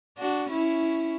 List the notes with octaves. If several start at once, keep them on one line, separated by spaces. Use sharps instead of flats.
D4 F#4
C#4 E4